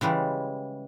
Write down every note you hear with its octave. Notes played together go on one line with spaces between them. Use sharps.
C#3 E3 G3 G#3